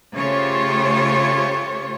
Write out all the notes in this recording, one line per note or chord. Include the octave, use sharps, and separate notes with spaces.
C#3 A3 F4 G4 C5 C#5